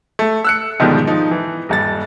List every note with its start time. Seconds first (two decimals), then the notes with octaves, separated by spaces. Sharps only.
0.19 A3
0.45 E6 F#6 C#7
0.80 G#2 B2 D3 D#3 F3 G3
1.07 F3 D#4
1.31 E3
1.69 D#1 G2 A6